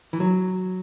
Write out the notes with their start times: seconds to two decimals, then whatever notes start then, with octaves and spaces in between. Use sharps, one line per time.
0.13 E3
0.20 F#3